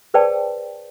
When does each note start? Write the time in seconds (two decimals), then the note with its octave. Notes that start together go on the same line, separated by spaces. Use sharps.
0.14 G#4 B4 C5 D5 G5 A5